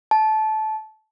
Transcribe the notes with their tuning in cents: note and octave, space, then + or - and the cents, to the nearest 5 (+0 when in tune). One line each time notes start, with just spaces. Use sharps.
A5 -20